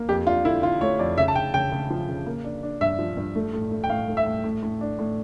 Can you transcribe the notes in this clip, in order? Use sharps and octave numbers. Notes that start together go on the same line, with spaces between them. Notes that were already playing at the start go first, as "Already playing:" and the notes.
Already playing: A#3
F2 G4
D4 F4
D3 E4
D3 F4
A3 C#5
F2 D5
C#3 E5
A5
C#3 G5
C#3 G5
C#3
F3
C#3
A#3
D4
D4
G2 E5
F3
G2
A3
A2
A3
G5
A2 F5
A3
E5
A2
A2
A2
D4
A2